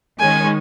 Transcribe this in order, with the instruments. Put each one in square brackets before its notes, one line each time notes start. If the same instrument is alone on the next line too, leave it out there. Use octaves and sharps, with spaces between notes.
[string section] D#3 G#3 C#4 [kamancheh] G#5